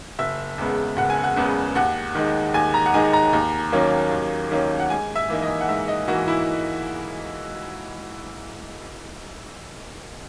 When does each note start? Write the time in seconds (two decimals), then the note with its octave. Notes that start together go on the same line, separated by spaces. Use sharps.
0.19 F#1 E5
0.58 E2 C#3 G#3 B3
0.97 F#1 F#5
1.10 G#5
1.24 F#5
1.36 E2 C#3 G#3 B3
1.75 D#2 F#5
2.15 D#3 G#3 D#4
2.54 D#2 G#5
2.74 A#5
2.86 F#5
2.94 D#3 G#3 D#4 G#5
3.13 A#5
3.33 D#2
3.72 D#3 F#3 A#3 C#4
4.12 D#2
4.51 D#3 F#3 A#3 C#4
4.80 F#5
4.90 G#2 G#5
5.15 E5
5.29 E3 A#3 D#4
5.42 D#5
5.61 F#5
5.69 G#2 E5
5.88 D#5
6.07 E3 A#3 D#4 F#4
6.28 E4